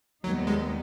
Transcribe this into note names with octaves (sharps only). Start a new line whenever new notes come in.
D#2 D#3 F#3 G3 B3 D#4
G#3